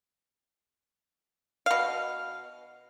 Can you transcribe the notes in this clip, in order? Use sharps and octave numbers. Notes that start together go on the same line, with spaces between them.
B2 F5